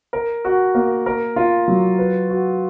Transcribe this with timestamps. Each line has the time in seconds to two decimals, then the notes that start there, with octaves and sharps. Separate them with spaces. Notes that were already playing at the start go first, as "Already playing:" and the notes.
0.13 A#4
0.45 F#4
0.75 A#3
1.06 A#4
1.36 F4
1.68 F#3
1.98 B4
2.29 F#4